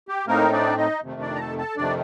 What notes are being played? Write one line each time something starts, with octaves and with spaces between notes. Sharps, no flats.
G4
A2 A3 A#3 C4 D#4 A#4
D4 D5
D#4 D#5
F2 C3 D#3 A3
D4 D5
A#5
A4 A5
A4 A5
F2 C3 D#3 A3 D4 D5